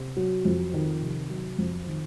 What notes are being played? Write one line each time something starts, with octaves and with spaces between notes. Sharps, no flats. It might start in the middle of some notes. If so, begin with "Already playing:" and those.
Already playing: C3
F#3
F2
D#3
C3
F#3
F2
D#3